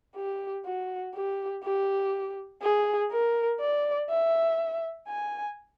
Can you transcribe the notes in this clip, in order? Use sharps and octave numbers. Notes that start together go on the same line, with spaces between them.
G4
F#4
G4
G4
G#4
A#4
D5
E5
G#5